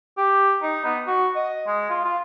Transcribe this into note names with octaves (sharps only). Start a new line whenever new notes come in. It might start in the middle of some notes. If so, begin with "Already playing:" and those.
G4
D#4
B3
F#4
D#5
G#3
F4
F4